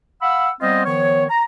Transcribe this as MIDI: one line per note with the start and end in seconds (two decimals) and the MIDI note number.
0.22 0.49 77
0.22 0.49 78
0.22 0.49 83
0.22 0.49 88
0.61 0.82 55
0.61 0.82 59
0.61 0.82 60
0.61 0.82 65
0.61 0.82 72
0.61 0.82 75
0.85 1.24 51
0.85 1.24 53
0.85 1.24 59
0.85 1.24 73
1.30 1.43 82